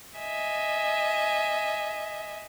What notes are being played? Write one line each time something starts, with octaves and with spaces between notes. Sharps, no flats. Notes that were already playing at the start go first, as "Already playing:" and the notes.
D#5 E5 G#5